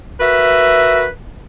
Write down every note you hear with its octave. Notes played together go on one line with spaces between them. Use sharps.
F#4 A#4 B4 E5